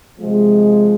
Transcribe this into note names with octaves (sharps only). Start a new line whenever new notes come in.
C3 F3 G#3